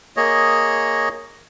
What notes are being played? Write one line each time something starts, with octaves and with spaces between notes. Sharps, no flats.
A#3 G#4 C#5 D#5